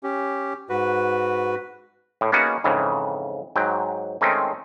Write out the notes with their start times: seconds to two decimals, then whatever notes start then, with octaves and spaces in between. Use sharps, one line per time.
0.03 C#4 G4
0.69 G#2 F#4 B4
2.21 A2
2.32 A#3 B3 C#4 D#4 F#4 G#4
2.64 F2 G#2 C#3 E3
3.56 G#2 F#3 G5
4.21 D#3 G#3 A3 C4 C#4 D#4